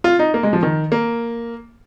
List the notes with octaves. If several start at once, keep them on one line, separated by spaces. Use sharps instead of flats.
F4
D#4
A#3
G#3
F3
D#3
A#3